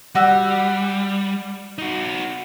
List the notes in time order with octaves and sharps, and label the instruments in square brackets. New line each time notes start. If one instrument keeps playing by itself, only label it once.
[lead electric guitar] G3 [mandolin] F#4 D5 E6
[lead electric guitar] D#4 F#4